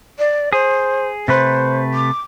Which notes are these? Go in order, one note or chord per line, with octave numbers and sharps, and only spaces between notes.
D5
G#4 C5
C3 A3 B4 C5
D6